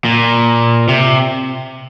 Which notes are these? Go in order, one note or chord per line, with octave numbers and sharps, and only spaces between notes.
A#2
C3